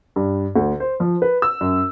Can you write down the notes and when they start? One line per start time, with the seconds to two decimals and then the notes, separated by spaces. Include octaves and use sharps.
0.16 G2
0.56 D2
0.80 C5
1.00 F3
1.22 B4
1.42 E6
1.61 F#2